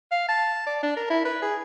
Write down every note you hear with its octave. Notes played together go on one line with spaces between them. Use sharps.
F5
A5
D5
D4
A#4
E4
B4
G#4